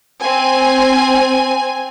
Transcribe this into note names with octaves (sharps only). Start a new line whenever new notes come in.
C4 G#5